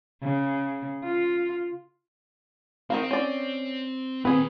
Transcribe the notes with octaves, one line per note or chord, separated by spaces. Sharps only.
C#3
F4
D#3 C4 A#4 F5
C#4 D5
A#2 D#3 C4 G#4 B4